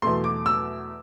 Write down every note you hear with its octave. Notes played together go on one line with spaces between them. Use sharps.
E2 B2 A3 C6
D6
E6